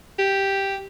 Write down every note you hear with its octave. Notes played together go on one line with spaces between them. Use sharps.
G4